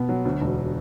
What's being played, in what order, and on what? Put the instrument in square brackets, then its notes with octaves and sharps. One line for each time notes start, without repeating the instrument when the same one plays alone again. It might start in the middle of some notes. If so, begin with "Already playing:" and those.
Already playing: [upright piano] B2 B3
F#3
D2
E1